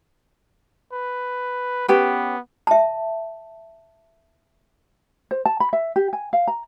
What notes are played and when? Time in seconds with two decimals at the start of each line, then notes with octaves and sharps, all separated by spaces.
0.93 B4
1.89 B3 C#4 G4 B4
2.67 E5 A5
5.31 C5
5.46 A5
5.60 B5
5.73 E5
5.96 G4
6.13 G#5
6.33 F5
6.48 A#5